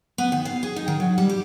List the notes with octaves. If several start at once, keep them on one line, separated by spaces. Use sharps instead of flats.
B3
D#3
F5
G#4
D#4
D#3
F#3
G3
G4